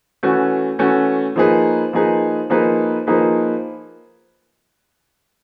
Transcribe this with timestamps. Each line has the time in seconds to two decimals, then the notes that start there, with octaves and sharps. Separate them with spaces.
0.23 E3 A3 C#4 F#4
0.79 E3 A3 C#4 F#4
1.36 F3 A#3 D#4 G#4 B4
1.93 F3 A#3 D#4 G#4 B4
2.50 F3 A#3 D#4 G#4 B4
3.07 F3 A#3 D#4 G#4 B4